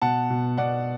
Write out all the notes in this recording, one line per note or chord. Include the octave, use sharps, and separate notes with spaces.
B2 F#5 A5
B2
B2 D5 F#5